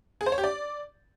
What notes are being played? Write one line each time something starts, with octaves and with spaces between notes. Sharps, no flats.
G#4
C5
C#5
G4
D5